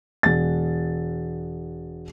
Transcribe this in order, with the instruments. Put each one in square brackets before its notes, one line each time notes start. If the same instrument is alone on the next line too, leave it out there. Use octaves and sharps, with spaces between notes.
[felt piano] E1 A6